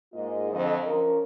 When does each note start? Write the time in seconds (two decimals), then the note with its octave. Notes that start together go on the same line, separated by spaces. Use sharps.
0.13 G#2 G#3 A#3 F4 D#5
0.51 F2 D3 F3 D#5
0.86 F3 C#4 A#4